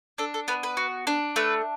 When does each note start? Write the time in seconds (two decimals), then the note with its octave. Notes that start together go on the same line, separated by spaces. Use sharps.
0.18 D4 A4
0.34 A4
0.48 B3 B4
0.63 B4
0.77 F#4
1.07 D4
1.36 A3 B4